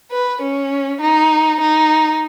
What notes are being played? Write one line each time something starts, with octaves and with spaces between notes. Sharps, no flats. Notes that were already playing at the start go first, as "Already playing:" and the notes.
B4
C#4
D#4
D#4